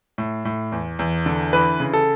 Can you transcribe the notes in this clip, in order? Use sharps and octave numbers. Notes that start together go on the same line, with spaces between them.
A2
A2
E2
E2
D3
E3 B4
C#3
A4